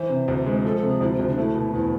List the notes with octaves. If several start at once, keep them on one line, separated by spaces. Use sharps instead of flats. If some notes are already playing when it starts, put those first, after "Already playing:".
Already playing: E3 C5
C3
D2
G#3
F3 A4
A4
C3
G#4
D2 E4
F4
D2
D4
A3 E4
B2
E2 E4